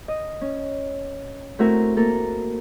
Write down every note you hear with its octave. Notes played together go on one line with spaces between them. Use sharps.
D#5
C#4
A3 C4 E4 F#4 A#4
A#3 A4 A#4